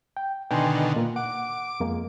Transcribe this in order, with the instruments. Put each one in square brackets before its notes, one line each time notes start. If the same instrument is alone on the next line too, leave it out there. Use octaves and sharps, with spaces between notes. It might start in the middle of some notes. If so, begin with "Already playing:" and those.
[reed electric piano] G5
[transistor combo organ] B2 D3 D#3 [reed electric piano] G5 G#5 C6
[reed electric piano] A#2 A#3
[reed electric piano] F#5 [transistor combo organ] D6
[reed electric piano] F2 G#3 A#3